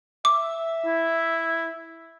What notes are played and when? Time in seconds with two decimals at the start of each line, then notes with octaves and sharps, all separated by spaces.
0.25 E5 D6
0.86 E4